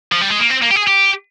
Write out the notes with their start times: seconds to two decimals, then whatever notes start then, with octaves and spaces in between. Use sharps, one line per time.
0.12 F3
0.21 G3
0.30 G#3
0.40 A#3
0.51 C4
0.63 A#3
0.71 G4
0.76 G#4
0.88 G4